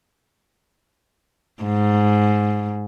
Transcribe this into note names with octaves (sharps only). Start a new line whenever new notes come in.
G#2